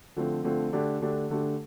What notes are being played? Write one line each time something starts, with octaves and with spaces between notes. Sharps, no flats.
D3 F3 A3 C4
D3 F3 A3 C4
D3 A3 D4 G4
D3 A3 D4 G4
D3 A3 D4 G4